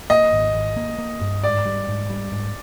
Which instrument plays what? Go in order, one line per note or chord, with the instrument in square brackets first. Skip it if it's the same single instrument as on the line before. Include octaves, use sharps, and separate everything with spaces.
[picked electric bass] A#3 [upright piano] D#5
[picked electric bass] G#1
G#1
A#3
A#3
G2
[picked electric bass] G#2 [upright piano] D5
[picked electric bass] G3
G#2
G3
G#2